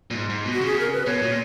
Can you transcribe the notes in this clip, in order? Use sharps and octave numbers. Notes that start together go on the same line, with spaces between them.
A#2
G#2
G#2
B2
F#4
C#3
G#4
A#4
B4
B2 C#5
A#2